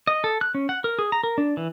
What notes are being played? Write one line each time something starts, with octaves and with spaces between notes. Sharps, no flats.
D#5
A4
F#6
C#4
F#5
A#4
G#4
A#5
A#4
D4
E3